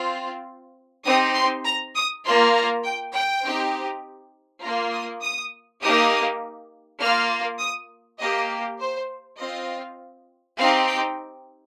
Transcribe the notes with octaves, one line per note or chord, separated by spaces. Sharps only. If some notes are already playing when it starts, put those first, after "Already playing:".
Already playing: C4 F4
C4 D#4 G4 D#6
C6
A#5
D#6
A#3 F4 C6
A#5
G5
G5
C4 D#4 G4
A#3 F4 A#5
D#6
D#6
A#3 D#4 G4 D#6
A#3 F4 F6
D#6
A#3 G4 D#5
C5
C4 F4 D#5
C4 D#4 G4 F5
G5